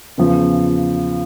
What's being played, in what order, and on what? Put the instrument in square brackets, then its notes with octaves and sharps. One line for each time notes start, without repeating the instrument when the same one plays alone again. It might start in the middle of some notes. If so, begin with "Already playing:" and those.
[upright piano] E2 C#3 F3